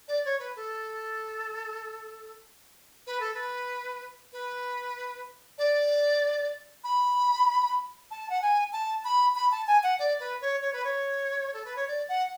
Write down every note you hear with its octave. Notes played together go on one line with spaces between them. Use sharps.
D5
C#5
B4
A4
B4
A4
B4
B4
D5
B5
A5
F#5
G#5
A5
B5
B5
A5
G#5
F#5
D5
B4
C#5
C#5
B4
C#5
A4
B4
C#5
D5
F#5